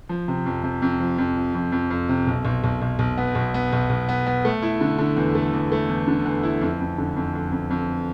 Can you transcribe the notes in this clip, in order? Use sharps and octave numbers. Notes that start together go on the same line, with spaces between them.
F3
C3
F2
C3
F2
F3
F2
F3
F2
F2
F2
C3
B1
B1
B1
B1
B1
B3
B1
B3
B1
B1
B3
B3
A3
E4
D3
D3
E2
A3
E2
A3
E2
D3
E2
E4
F2
F2
D3
F2
F2
F2
F2